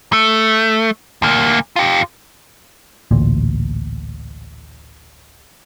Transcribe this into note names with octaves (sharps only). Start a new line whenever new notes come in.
A3
D2 A#3
F4 G4
A1 D2 A#2